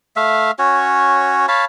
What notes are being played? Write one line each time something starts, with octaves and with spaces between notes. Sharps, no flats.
A3 E5 F5
C#4 F#4 C#5
C#5 F5 A5 B5